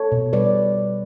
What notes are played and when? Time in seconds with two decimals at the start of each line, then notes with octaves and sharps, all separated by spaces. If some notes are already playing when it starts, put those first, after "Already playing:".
Already playing: A4 C#5
0.12 B2
0.33 G3 B4 D5